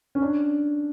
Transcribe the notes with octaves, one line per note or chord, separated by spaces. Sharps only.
C#4
D4